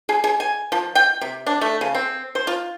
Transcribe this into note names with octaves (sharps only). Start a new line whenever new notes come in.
G#4
G#4
G#5
F3
G5
C3
D4
A3
C#3
C4
C5
F4